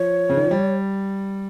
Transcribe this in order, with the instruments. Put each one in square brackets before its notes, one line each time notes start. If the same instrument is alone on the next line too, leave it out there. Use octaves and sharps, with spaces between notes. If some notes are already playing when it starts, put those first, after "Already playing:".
Already playing: [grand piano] F3 [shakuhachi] C#5
[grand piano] C#3
D#3
F3
G3